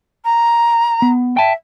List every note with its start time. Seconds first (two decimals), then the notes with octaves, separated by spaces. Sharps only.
0.24 A#5
1.02 B3
1.37 E5 G5 A5